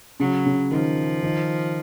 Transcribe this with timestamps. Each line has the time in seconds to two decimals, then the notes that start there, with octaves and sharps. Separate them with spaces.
0.20 C#3 F#3
0.46 C#3
0.71 D#3 F3
1.23 D#3